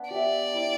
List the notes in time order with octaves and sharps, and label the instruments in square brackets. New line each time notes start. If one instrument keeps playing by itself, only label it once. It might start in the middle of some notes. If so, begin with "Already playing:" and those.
Already playing: [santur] B3 D4
[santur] G4 E5 [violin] D5
[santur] E4